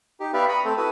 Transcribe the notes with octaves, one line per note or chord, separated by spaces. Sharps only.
D#4 G4
B3 G4 B4 D5 E5 F5
A#5 B5 C#6 D#6
A3 C4 A4
E4 F#4 A4 B4 D#6